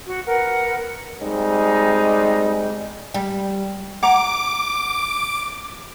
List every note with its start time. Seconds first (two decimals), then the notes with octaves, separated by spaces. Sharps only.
0.08 F#4
0.25 A#4 B4 F#5
1.19 G3 G#3 C4 D#4
3.14 G3
4.03 F#5 A#5 D6